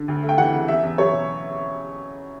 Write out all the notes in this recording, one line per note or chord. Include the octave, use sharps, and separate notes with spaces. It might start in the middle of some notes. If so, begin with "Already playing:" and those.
Already playing: D3
D2
A3
G5
E3 F#5
C#3
E2 E5
E2
F#3 C#5
B2